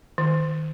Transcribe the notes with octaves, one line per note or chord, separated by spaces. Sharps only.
D#3